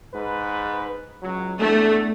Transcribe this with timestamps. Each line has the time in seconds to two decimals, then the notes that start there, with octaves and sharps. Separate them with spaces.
0.13 G#2 B4
1.22 C#2 F#3
1.60 E2 A3 D4